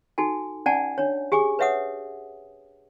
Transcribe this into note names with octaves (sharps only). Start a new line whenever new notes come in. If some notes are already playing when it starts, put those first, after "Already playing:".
D#4 F#4 A4 G#5
C#4 D5 F#5 G#5 A5
D4 C#5
G4 G#4 G#5 D6
B4 C#5 E5 F#5 D#6